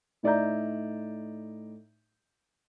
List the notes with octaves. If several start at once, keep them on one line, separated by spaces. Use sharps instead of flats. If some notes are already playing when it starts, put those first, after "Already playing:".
A2 D#4 D5 E5 A#5 G6